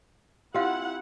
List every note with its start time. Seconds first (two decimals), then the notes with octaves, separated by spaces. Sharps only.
0.54 C4 E4 F4 G4 F5 F#5